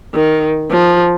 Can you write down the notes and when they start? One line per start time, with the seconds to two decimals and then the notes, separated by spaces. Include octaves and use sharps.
0.14 D#3
0.71 F3